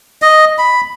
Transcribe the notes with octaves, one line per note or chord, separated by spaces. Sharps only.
D#5
B5